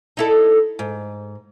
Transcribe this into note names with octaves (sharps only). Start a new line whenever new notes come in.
D#4 E4 A4
G#2